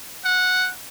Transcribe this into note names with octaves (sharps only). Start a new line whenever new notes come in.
F#5